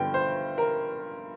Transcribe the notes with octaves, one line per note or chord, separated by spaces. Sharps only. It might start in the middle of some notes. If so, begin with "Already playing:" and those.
Already playing: G1 G2 D3 F3 G5
C5
A#4